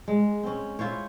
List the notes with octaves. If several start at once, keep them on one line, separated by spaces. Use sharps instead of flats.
G#3
C4 C#4
E4 F4 C5 C#5